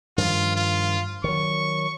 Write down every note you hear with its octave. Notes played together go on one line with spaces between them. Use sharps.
G2 D#3 F3 F4
F4
D#3 F#3 C#6